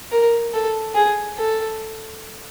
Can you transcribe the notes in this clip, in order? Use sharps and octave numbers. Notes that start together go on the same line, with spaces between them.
A#4
A4
G#4
A4